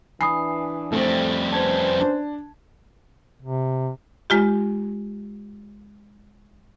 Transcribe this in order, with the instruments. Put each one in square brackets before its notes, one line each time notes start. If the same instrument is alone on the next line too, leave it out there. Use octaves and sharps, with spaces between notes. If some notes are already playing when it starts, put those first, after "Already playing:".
[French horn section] E3 D4 [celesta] G#5 B5 D#6 [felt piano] C7
[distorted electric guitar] F2 G3 [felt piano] A3 C4
[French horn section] C#4 B4 C5 [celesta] A5 G#6
[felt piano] D4
[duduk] C3
[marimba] G#3 F4 G4